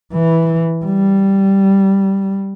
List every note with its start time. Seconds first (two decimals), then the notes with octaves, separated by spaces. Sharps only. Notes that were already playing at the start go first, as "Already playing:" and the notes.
0.14 E3
0.85 G3